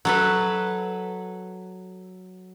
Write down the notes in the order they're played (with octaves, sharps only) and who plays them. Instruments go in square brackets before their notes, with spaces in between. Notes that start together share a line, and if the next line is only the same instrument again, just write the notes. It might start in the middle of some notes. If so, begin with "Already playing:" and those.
[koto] F#3 A4 B4